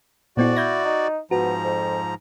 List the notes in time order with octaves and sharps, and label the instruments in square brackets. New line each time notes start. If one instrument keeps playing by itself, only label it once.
[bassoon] F2 [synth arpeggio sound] A#2 B3 E4 [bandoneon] F#4 D5
[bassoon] E4 [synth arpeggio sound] G6 G#6 A#6
[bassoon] D#4
[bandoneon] G#2 F3 A#5 [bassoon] B3 [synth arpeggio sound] F#4
[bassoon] F2